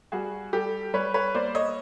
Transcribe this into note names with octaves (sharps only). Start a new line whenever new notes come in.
G3 F#4 G#4
G3 G4 A4
G3 B4 C#5
B4 C#5
A#3 C5 D5
C#5 D#5